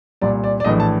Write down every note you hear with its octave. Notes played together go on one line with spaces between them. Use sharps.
C2 A#2 D5
D5
D5
A#1 A2 E3 D#5
A5